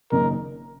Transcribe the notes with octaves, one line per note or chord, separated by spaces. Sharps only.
F#1 F#2 D#3 A#3 D#4 A#4